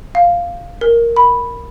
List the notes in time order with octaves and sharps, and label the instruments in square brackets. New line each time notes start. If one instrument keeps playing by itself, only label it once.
[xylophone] F5
A#4
B5